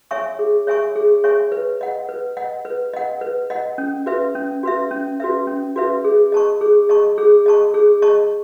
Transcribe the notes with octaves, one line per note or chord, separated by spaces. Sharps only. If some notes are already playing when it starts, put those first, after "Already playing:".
C#5 E5 G#5 C#6
G#4
C#5 E5 G#5 C#6
G#4
C#5 E5 G#5 C#6
B4
D#5 F#5
B4
D#5 F#5
B4
D#5 F#5
B4
D#5 F#5
C#4
F#4 B4 E5
C#4
F#4 B4 E5
C#4
F#4 B4 E5
C#4
F#4 B4 E5
G#4
D#5 A5 C#6
G#4
D#5 A5 C#6
G#4
D#5 A5 C#6
G#4
D#5 A5 C#6